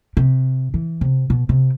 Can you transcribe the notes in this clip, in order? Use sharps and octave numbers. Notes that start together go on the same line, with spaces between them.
C3
E3
C3
B2
C3